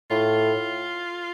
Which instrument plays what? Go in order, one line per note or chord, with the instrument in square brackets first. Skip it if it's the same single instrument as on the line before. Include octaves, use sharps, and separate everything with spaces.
[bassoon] A2 [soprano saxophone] F4